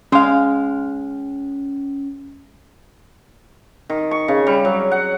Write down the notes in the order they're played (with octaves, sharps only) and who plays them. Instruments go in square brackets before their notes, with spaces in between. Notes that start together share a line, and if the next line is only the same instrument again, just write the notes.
[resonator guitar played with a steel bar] G#3 F5 [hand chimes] C#4
[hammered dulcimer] D#3
C#6
C#3
G3
F#3
F#5